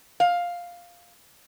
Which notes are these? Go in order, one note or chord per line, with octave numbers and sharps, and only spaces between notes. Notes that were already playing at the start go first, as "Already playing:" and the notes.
F5